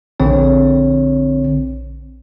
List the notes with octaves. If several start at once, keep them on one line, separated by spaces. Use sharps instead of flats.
A#1 D3 C4 C#5